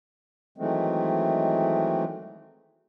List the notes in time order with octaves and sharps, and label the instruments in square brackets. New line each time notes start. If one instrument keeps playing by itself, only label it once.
[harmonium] D#3 E3 F#3 G#3 A3 C4